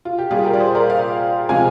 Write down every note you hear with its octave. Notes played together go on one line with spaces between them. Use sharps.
F4
G4
A#2 G3 F4 G#4
G4 A#4
D5
G#4 C5
A#4 D5
D5 F5
C3 F3 G#3 F5 G#5